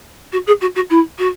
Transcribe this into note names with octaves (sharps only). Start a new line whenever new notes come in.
F#4
G#4
F#4
F#4
E4
F#4